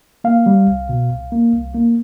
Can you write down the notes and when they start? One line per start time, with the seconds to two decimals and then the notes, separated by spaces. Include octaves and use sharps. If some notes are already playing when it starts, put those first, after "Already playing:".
0.24 A#3 F5
0.46 G3
0.67 C2
0.89 B2
1.10 C2
1.32 A#3
1.53 C2
1.74 A#3